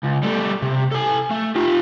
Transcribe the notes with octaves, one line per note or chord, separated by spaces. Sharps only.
C#2
G3 A3
C3
A4 G#5
A3
F4 G4